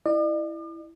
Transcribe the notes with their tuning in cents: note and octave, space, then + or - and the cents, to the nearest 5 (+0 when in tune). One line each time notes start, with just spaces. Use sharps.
E4 +0 D5 +45